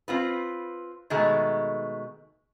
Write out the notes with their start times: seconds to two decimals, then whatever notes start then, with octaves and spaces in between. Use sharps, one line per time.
0.08 C4 F4 B4
1.10 B2 D#3 G#3 A3